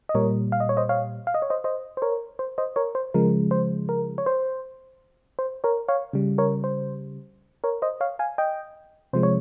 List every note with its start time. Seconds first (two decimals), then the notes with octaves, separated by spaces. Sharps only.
0.09 D#5
0.15 A#2 G3 A#4 C#5
0.52 F5
0.60 D#5
0.69 C#5
0.77 C5 D#5
0.89 C#5 F5
1.27 F5
1.34 D#5
1.42 C#5
1.50 C5 D#5
1.64 C5 D#5
1.97 C5
2.02 A#4 C#5
2.39 C5
2.58 C5 D#5
2.76 A#4 C#5
2.95 C5
3.14 C#3 F3 G#3 A#4
3.51 C5
3.89 A#4
4.18 C#5
4.26 C5
5.39 C5
5.64 A#4 C#5
5.88 C#5 F5
6.13 C#3 G3
6.38 A#4 C#5
6.64 C5
7.64 A#4 C#5
7.82 C5 D#5
8.01 C#5 F5
8.19 F5 G#5
8.38 D#5 G5
9.13 C3 F3 G#3 C5
9.23 C#5